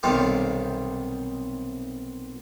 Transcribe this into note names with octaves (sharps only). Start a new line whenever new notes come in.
B1 C3 D#3 G3 F5 D6